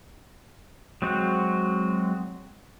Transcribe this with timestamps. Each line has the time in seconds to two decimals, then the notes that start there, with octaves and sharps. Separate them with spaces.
1.02 F#3 G#3 C4 F#4